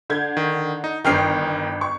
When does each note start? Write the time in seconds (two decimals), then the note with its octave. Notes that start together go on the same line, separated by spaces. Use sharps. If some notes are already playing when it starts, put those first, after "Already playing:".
0.10 D3 G6 G#6
0.37 D#3
0.84 D#4
1.05 G1 D#3 G5 F6 C7
1.81 C#6